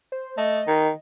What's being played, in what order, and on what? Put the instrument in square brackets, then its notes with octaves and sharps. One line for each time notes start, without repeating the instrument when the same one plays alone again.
[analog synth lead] C5
[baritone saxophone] A3 [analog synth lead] D#5
[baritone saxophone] D#3